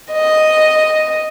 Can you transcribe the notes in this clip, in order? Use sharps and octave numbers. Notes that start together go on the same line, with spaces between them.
D#5